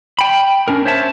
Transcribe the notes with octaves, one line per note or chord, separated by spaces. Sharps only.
G5 B5
C#4 D4 A#4
C5 C#5 E5 A5